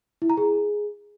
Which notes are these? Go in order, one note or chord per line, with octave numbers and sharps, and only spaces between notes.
E4
A#5
G#4